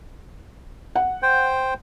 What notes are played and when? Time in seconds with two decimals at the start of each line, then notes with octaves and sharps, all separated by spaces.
0.95 F#5
1.23 C5 G5